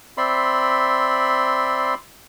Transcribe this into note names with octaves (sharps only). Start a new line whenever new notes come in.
C4 D5 E5 B5 C6